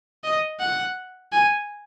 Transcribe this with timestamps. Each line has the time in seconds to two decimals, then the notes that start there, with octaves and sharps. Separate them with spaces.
0.24 D#5
0.60 F#5
1.32 G#5